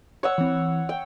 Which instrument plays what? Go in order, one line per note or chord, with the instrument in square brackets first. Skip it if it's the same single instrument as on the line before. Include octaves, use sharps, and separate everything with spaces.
[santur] C#5 F#5 E6
[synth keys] E3 C4
[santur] G5